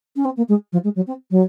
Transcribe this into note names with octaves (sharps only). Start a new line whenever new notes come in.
C#4
C4
A#3
G#3
F3
G#3
F#3
C4
F#3